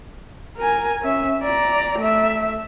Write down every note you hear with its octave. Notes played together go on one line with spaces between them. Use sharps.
A#4 G#5
C#4 E5
D5 A#5
A3 E5